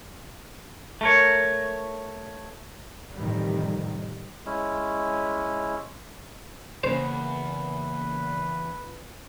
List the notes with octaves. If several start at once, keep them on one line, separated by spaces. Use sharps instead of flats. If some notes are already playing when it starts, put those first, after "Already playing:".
A3 A#4 C#5
F2 A2 C3 D#3 E3 G3
G#3 C#4 E4
E2 G2 C#3 A#3 C#4 B4 C5